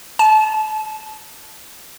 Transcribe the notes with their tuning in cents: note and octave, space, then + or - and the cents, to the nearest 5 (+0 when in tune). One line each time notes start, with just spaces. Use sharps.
A5 -25